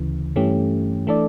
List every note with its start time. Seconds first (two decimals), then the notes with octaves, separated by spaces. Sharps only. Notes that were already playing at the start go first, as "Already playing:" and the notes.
Already playing: D2 C#3 E3
0.36 G2 E3 A3 C#4 G4
1.07 E3 A3 D4 A4 D5